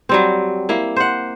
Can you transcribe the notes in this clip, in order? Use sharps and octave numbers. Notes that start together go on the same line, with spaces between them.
F#3 G3 C4
A#3 E4
C5 F#5